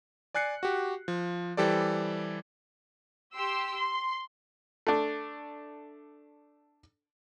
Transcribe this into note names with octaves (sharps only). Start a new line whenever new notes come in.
D5 G#5 F#6 C7 C#7
F#4 G4
F3
E3 G3 G4 A4 C5 D5
G4 C6 E6
C6
A3 D4